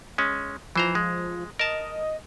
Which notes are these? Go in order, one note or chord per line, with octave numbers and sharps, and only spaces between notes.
G#3 C#4
E3 F3 C5 A#5
G#3
A#4 D#5 A5